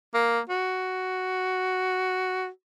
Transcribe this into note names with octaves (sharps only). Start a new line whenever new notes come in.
A#3
F#4